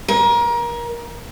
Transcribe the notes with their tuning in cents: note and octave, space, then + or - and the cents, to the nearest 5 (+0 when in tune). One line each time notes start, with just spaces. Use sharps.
A#4 +25